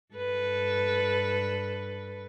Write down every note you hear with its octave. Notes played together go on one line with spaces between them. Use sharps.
G2 A4 B4